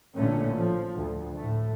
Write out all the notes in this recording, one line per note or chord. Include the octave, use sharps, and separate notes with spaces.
A1 A#2 D3 A3 C#4
F3
D2
A2 A3